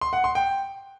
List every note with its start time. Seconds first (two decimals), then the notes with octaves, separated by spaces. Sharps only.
0.01 C6
0.13 F#5
0.24 C6
0.35 G5